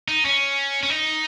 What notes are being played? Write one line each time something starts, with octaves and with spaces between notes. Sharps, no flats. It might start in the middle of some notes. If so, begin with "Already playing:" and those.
D#4
C#4
C#4
D#4